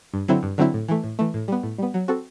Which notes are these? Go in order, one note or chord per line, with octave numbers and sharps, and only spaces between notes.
G2
D3 F#3 C4 E4
G2
D3 F#3 C4 E4
A2
E3 A3
A2
E3 A3
A2
G3 B3
A2
G3 B3
F#3
C4 F#4 A4